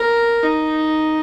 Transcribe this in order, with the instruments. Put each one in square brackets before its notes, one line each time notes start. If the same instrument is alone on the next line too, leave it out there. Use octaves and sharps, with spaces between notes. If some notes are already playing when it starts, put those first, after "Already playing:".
Already playing: [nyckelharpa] A#4
D#4